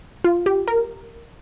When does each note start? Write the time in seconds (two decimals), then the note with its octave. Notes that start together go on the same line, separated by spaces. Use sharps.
0.24 F4
0.46 G4
0.68 A#4